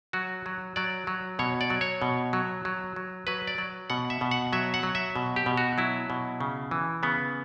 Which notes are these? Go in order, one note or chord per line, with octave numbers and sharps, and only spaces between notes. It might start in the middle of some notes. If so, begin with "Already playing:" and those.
F#3 F#4
F#3
F#3 D5
F#3
B2 C#5
D5
F#3
C#5
B2
F#3
F#3
F#3
F#3 B4
D5
F#3
B2 F#5
E5
B2
F#5
F#3 E5
F#5
F#3
E5
B2
G4
B2
F#4
F#3 E4
B2
C#3
E3
C#3 B3